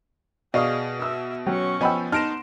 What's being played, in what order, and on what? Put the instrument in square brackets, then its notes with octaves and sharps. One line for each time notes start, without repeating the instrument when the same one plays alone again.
[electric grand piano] B2 [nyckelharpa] G#4 [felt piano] D5 C#6 D#6 [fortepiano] D#5 F5
[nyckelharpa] E5 [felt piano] D#6 E6
[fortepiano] F#3 [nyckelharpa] C#4 C#6 [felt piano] G5
[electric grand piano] F3 B3 [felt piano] D#5 G5 [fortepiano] G#5 B5 E6
[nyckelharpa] B3 C6 [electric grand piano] D#4 D7 E7 [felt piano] A5 A#6 [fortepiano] F6